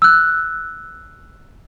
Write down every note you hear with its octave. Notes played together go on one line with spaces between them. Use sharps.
E6 F#6